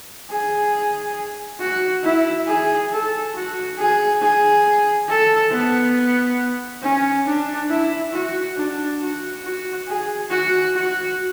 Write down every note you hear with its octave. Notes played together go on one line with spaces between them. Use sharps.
G#4
F#4
E4
G#4
A4
F#4
G#4
G#4
A4
B3
C#4
D4
E4
F#4
D4
F#4
F#4
G#4
F#4
F#4